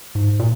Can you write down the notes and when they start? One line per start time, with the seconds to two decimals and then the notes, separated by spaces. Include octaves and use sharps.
0.15 G#2
0.39 A#2